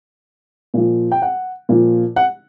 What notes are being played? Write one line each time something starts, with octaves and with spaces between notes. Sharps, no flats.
A#2 F3
G5
F#5
A#2 F3
F#5